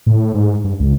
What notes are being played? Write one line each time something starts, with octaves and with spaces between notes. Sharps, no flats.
A2
G#2
G2
C#2